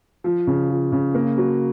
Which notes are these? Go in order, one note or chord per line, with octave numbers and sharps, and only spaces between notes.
F3
C#3
F3
C#3
A#3
F#3